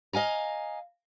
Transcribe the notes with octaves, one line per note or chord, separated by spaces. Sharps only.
D#5 F5 G#5 A#5